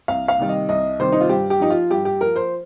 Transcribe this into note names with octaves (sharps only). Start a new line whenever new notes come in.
C2 F5
F5
C3 D#3 G3
D#5
C2 D#5
C3 D#3 G3 C5
D#4
F4
G2 G4
G4
F3 D#4
F4
G2 G4
G4
F3 A#4
C5